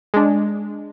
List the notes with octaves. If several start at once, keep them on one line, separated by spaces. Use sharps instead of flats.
G#3 D4